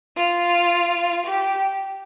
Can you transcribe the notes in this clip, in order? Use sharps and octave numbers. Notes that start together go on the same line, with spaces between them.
F4
G4